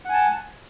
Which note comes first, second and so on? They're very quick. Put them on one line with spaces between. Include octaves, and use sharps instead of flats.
F#5 G#5 A5